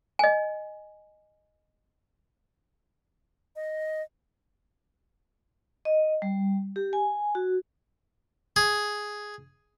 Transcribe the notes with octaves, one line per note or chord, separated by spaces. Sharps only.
D#5 G#5
D#5
D#5
G3
G4
G#5
F#4
G#4